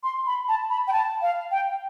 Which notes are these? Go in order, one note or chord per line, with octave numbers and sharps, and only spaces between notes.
C6
B5
A5
B5
G5
A5
F5
G5